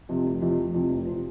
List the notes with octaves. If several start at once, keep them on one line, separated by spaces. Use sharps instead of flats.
F2 C3 F3
F1
F2 C3 F3
F1
F2 C3 F3
F1
C3 F3